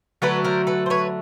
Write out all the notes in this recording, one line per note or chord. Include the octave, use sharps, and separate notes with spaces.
D3 F#3 A3 A4 B4
A#4 C5
A4 B4
C5
B4 C#5